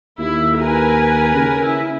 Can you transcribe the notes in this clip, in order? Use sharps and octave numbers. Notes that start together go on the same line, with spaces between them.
D#2 E4
A#4 B4 G#5
C#3
E4